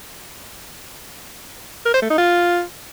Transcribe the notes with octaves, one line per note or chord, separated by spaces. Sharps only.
A#4
C5
A3
D#4
F4